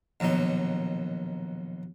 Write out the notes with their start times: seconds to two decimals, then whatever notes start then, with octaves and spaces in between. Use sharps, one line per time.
0.20 A#1 D#2 B2 F#3 D#4